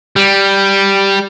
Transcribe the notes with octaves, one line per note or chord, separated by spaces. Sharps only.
G3